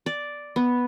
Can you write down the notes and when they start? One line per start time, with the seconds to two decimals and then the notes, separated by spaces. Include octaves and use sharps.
0.06 D5
0.56 B3